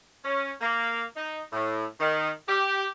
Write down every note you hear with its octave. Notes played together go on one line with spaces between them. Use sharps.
C#4
A#3
D#4
A2
D#3
G4